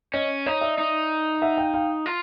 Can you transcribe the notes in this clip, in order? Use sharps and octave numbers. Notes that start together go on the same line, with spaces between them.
C#4 C#5 D#5
D#4 C#5 D#5
D5 E5
D#4
E5 F#5
F5 G5
F5 G5
F4